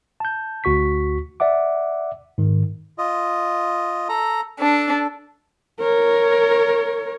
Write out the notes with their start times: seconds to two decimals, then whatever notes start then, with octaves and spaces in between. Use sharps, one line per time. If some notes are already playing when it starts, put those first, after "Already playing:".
0.20 A5 G6
0.64 D2 F#4 C#6 B6
1.40 D5 E5 F#5 D6
2.38 G#2 D#3
2.98 F4 D#5
4.09 A4 A#5
4.59 D4 A4
5.80 A#4 C#5